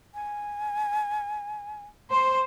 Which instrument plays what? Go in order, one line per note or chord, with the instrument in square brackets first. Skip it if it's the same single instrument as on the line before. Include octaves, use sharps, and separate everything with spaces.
[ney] G#5
[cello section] C5